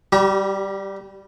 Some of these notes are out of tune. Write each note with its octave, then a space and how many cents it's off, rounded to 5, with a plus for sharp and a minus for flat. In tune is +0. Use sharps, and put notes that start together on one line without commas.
G3 +0 G4 -35 A#5 +45